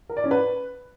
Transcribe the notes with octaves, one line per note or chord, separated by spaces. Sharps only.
A#4
D5
C#4
B4